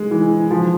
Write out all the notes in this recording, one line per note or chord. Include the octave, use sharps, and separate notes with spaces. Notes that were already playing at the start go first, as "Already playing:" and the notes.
Already playing: G#3
E3
F3